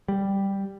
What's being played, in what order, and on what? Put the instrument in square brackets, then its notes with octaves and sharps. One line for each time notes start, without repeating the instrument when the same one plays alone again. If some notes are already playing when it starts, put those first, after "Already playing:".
[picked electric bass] G3